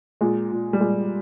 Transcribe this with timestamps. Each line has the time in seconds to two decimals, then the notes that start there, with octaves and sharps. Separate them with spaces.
0.21 A#2 G#3
0.52 A#2
0.73 G3
0.81 A#2 G#3